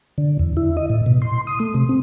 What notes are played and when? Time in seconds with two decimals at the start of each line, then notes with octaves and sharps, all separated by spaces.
0.18 D3
0.39 E2
0.57 E4
0.77 D#5
0.90 A2
1.06 B2
1.22 C6
1.47 D#6
1.60 A3
1.75 C3
1.89 C4